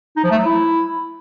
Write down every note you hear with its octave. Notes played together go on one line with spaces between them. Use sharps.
D#4
F3
A3
F#3
E4